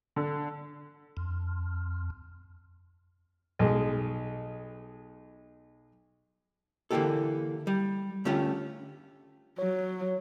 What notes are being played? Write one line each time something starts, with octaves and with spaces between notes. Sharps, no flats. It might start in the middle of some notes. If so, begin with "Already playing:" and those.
D3
F2
B1 G#3
D3 E3 A#3 E4 G4 A4
G3
D3 A3 C#4 F4 G4
F#3 C#5